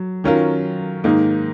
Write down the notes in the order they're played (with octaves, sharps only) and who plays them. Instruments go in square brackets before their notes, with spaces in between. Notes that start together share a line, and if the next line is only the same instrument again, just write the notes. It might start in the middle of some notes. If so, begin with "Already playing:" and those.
Already playing: [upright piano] F#3
D#3 F#3 C#4 F4 A#4
G#2 D#3 A#3 D#4